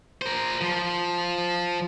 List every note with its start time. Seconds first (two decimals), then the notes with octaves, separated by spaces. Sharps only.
0.22 A#4 C5
0.61 F3